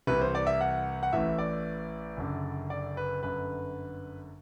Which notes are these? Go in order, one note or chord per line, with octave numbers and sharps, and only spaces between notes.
C2 C3 E3 B4
C5
D5
E5
F#5
F#5
A1 A2 E3 E5
D5
F#1 F#2 D3
D5
B4
G1 F#2 D3 B4